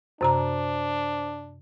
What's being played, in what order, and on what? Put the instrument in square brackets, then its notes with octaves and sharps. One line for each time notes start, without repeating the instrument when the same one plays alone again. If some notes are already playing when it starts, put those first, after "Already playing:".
[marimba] F#2 C3 A#5 [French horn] D4 [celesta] C5